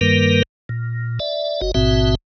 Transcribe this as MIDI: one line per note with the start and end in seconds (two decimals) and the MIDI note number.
0.01 0.43 43
0.01 0.43 51
0.01 0.43 55
0.01 0.43 58
0.01 0.43 70
0.01 0.43 71
0.69 1.19 46
1.20 1.61 74
1.20 1.61 76
1.61 1.71 30
1.61 1.71 66
1.61 1.71 75
1.75 2.15 33
1.75 2.15 44
1.75 2.15 47
1.75 2.15 60
1.75 2.15 66
1.75 2.15 76